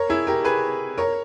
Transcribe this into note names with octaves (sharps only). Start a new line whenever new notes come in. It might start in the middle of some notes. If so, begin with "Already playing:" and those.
Already playing: A#4 C#5
E4 G#4
G4 A#4
G#4 B4
A#4 C#5